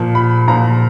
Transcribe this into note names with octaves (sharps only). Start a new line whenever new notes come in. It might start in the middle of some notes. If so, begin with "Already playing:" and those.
Already playing: A#2 F3
B5
A#2 F3 A#5